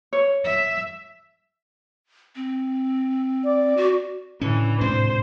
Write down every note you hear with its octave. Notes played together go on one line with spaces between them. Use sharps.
C#5
E5
C4
D5
F#4
A2 D3 E3 C#4
D2 G#2 C3 C5